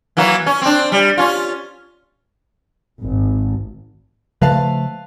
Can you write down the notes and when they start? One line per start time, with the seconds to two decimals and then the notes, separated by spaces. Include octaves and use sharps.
0.17 E3 F#3 A#3
0.46 C#4
0.62 C4 D4
0.92 G3
1.18 C#4 F4
3.01 G#1
4.42 C#3 F3 A3 B4 F5 A5